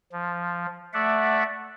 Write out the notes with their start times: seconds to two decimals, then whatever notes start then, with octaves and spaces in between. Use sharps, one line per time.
0.12 F3
0.93 A3 D5 E5 F#5